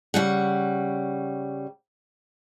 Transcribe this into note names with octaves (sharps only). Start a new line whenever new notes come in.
C#3 G3 F#5